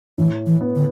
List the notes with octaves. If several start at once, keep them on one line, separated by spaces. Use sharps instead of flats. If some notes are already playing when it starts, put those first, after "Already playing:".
A2 E3
E3
B3
D3